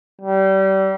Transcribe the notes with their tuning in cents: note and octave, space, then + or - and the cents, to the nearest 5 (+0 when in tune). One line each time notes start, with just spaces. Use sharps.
G3 -30